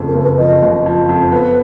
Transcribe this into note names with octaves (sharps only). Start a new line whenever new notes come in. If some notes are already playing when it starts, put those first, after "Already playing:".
Already playing: F#1 F2 C#3
A#4
F#1
B4
F3 D#5
F#1
F3
F2
B3 B4